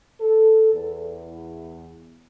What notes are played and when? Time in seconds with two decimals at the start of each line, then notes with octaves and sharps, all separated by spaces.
0.21 A4
0.73 E2